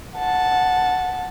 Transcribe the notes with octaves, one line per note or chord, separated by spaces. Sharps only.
F#5 A5